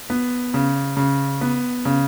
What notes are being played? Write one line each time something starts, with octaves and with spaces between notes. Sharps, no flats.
B3
C#3
C#3
B3
C#3